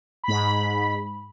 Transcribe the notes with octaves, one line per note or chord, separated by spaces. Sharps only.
G#2 B5